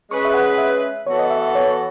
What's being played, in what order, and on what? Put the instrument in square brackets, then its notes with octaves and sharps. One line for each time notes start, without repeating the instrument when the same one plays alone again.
[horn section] G#3 C#4 G#4 B4 [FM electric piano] C#6
[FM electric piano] E5
F#5
E5
[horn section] E3 B3 F#4 A4 [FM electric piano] C#5
[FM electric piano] D#5
E5
E5
C#5